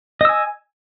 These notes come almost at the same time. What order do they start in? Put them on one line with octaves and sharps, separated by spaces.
D#5 E6 G#5